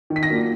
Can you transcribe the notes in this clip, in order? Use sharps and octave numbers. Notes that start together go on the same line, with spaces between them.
D#3
B6
A#6
F#3 A#3 D4 F4